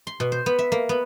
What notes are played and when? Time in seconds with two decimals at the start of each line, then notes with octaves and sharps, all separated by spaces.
0.07 C6
0.20 B2
0.32 C5
0.46 B3
0.59 E5
0.72 A#3
0.89 B3